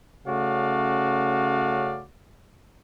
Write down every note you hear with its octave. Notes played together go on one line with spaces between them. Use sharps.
C#3 A3 C#4 F#4 D5 F5